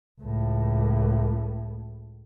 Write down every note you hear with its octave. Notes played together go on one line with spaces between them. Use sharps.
C#2 A2